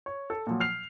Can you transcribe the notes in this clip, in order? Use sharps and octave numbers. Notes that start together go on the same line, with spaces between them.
C#5
A4
A#2 F3 F#3
F6 C7 F7